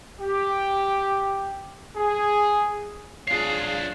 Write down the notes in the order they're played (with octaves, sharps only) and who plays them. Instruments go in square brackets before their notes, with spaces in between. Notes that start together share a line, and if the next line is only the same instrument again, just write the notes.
[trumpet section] G4
G#4
[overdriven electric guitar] D4 C#5 [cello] F4 G#4 [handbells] C7